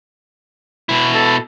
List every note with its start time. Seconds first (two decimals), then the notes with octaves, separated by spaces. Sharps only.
0.89 B2 E4
1.14 A4